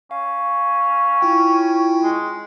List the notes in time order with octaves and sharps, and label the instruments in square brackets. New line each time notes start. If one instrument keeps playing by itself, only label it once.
[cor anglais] C#4 [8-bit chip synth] F5
[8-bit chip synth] E4 F4 G5
[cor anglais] G#3